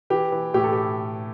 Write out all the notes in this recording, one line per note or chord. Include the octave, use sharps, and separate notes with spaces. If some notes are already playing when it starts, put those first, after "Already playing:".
E3 G4
E3
A2 G4
A4
G4